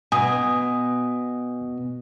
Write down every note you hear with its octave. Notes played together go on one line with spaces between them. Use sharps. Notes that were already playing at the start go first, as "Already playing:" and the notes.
B2 G#5 D#6